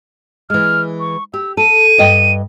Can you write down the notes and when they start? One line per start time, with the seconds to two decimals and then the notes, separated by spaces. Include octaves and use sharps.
0.50 E3 G#3 F6
1.00 C#6
1.34 G4 E6
1.57 A4 D#7
1.98 G2 D#5 G5